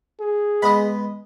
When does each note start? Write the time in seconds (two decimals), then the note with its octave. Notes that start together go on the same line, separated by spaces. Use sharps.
0.20 G#4
0.62 G#3 B3 D#5 B5